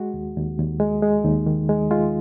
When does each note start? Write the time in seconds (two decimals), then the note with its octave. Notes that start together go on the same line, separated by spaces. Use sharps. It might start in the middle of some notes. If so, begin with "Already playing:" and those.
Already playing: G#3 F#4
0.14 D#2
0.36 D#2
0.58 D#2
0.80 G#3
1.02 G#3
1.24 D#2 D#4
1.46 D#3
1.69 G#3
1.91 G#3 F4